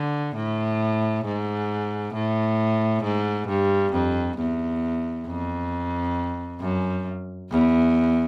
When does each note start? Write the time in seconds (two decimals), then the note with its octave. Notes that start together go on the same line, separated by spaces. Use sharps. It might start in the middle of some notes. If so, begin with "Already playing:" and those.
Already playing: D3
0.35 A2
1.25 G#2
2.14 A2
3.04 G#2
3.48 G2
3.93 F2
4.38 E2
5.27 F2
6.60 F#2
7.50 E2